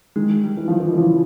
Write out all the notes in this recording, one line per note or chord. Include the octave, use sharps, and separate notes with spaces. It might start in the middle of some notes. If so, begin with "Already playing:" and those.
D#3 G#3
G3
E3
D#3 F3
E3
E3
C#3 F3